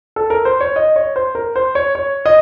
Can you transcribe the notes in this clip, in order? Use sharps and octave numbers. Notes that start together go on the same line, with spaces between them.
A4
A#4
C5
C#5
D#5
C#5
C5
A#4
C5
C#5
C#5
D#5